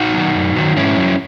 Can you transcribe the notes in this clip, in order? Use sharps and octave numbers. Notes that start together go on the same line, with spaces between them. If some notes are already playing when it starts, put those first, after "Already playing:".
Already playing: D#4 F#4
D#3 F#3
F#2
D#3 F#3
G#2 C#4 E4
F#3